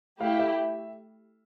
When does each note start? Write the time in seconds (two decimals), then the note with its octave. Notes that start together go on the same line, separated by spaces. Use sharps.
0.21 A3 E4 G4 F5
0.39 E5